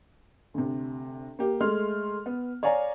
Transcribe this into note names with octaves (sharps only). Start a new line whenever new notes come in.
D2 C3
A#3 G4
G#3 A3 C6 F6
B3
C#5 D5 F5 G#5 A#5